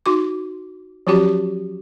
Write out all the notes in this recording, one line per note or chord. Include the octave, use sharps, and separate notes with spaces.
D#4 F#4 D6
F3 F#3 C#4 F#4 G4